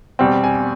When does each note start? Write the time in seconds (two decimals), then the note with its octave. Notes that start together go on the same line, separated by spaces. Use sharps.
0.19 E2 B2 G3 C4
0.44 G#5